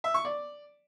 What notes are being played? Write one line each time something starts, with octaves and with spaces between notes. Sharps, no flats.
E5
C#6
D5